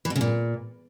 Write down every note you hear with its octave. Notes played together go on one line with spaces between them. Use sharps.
E3
B2
C#3
A#2